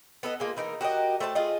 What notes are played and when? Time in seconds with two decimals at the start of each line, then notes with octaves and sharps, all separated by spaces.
0.23 B3 A4 D#5
0.40 G#3 A#3 F4
0.57 E3 D#4 A#4
0.81 F#4 G4 A#4 D#5
1.20 A3 C5 C#5 A5
1.35 F4 G#4 D#5